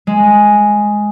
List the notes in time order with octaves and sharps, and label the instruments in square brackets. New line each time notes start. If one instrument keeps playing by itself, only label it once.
[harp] G#3